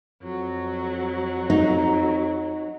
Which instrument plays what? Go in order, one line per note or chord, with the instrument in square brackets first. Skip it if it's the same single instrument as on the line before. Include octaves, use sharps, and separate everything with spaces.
[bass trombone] F2 [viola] F#3
[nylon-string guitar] D#4